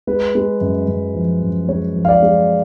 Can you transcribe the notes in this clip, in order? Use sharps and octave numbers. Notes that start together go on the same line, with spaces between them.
G#3 B4
G#3
F#2
F#2
F3
F#2
G#3 C#5
F3
F5
D5
G#3